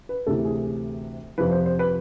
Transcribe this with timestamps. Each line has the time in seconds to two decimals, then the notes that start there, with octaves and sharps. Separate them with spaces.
0.09 B4
0.27 D2 C3 E3 A3 A4
0.45 G#4
1.38 F2 C3 F3 B4
1.51 C5
1.66 C5
1.79 B4